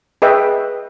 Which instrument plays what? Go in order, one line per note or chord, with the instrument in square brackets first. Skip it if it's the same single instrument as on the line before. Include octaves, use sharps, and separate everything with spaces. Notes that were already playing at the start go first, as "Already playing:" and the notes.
[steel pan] G#4 B4 D#5 E5 G5